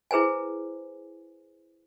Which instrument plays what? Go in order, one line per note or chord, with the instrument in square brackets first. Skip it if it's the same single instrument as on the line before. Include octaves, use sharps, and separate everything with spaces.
[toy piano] E4 G#4 B4 C5 G#5